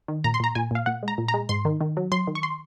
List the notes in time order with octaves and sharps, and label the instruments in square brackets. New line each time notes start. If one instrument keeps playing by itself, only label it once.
[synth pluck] D#3
A#2 A#5
C6
A#2 A#5
A#2 G#5
A#2 F5
A#2 F#5
G#3
A#5
A#2
A#5
G#3
G#2 C6
D#3
D#3
F#3
F#3 C6
D#3
C#6
C6